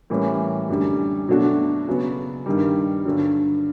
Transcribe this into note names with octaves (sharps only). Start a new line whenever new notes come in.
A2 E3 G3 A#3 C#4
F#2 D3 G3
B2 F#3 A3 D4 F#4
C#3 F#3 B3
G2 D#3 G3
G2 D3 F#3